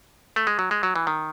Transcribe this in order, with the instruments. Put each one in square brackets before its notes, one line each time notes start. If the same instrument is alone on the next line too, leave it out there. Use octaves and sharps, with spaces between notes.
[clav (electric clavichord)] A3
G#3
F#3
G#3
F#3
E3
D#3